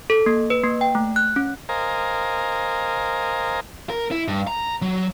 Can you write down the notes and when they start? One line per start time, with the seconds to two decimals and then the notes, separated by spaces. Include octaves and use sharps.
0.10 A4
0.26 A#3
0.50 B4
0.64 A#3
0.81 G5
0.95 A3
1.16 F#6
1.36 C#4
1.69 A#4 C5 D#5 F5 G#5 A#5
3.90 A#4
4.11 E4
4.28 G2
4.47 A#5
4.82 F#3